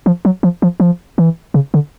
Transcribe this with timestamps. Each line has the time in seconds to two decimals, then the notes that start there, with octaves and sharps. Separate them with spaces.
0.06 F3
0.25 F#3
0.43 F3
0.62 F3
0.80 F3
1.18 E3
1.54 C#3
1.74 D3